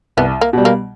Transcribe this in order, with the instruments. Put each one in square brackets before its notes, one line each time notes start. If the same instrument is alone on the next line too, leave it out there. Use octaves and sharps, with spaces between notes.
[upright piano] C2 [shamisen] B3
[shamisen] A#3
[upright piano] B2 G3
[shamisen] A#3